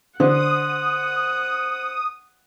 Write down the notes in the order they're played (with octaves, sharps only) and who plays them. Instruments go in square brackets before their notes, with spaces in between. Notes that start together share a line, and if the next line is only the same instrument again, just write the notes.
[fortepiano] D3 [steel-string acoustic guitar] C5 [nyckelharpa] F#5 [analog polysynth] D#6